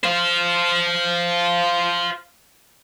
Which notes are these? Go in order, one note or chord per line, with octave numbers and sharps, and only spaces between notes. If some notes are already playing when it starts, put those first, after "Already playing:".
C5 F5